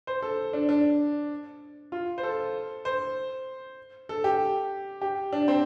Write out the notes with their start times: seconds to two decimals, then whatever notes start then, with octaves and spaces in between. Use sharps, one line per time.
0.07 C5
0.22 A4
0.53 D4
0.69 D4
1.92 F4
2.18 C5
2.23 A4
2.85 C5
4.09 A4
4.24 G4
5.02 G4
5.33 D4
5.48 C4